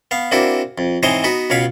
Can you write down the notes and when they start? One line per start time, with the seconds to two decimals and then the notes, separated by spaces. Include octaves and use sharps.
0.11 B3 F5
0.32 A#3 C4 D4 E4 F#4
0.78 F2
1.03 G#2 E3 C4 C5 C#5 D#5
1.24 B3 D#4 F#4 B4
1.50 C#2 B2 C#5 F5 B5